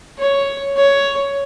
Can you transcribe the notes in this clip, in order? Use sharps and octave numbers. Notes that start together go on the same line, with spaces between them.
C#5
C#5